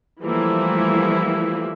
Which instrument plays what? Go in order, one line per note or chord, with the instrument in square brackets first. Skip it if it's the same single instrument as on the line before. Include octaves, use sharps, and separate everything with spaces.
[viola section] E3 F3 G3 A3 A#3 E4